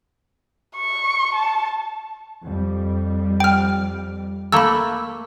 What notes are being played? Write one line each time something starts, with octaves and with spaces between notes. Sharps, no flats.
C#6
A5
F2 G3
G5 F6
A3 A#3 A4 B5 E6